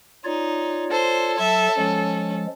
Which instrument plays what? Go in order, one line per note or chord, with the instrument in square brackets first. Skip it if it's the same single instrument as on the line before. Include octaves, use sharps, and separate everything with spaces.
[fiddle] D#4 [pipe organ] F4 C#5 D5
[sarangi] A4 [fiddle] C5
[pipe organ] F#3 [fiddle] E5
[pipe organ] F3 G#3 [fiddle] C#4